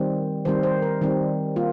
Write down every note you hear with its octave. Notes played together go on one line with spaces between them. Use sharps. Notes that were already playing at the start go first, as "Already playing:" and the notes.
Already playing: D#3 G3 C4
D#3 G3 C4 C5
C5
A#4
D#3 G3 C4
A#3 F4